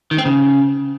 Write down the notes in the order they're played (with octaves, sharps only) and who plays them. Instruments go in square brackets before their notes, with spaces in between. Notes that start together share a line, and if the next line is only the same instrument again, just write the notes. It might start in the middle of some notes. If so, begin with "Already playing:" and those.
[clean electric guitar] D#3
C4
C#3